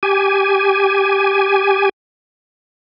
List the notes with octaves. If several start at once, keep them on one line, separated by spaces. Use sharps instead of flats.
G4 G#5